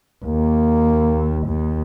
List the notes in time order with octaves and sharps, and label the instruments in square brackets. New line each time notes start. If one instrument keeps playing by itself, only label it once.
[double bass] D#2 [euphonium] A#3
[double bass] D#2